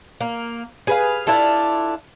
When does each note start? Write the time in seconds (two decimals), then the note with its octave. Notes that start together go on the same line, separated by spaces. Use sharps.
0.21 A#3
0.87 G#4 B4 F5
1.27 D4 E4 F4 A4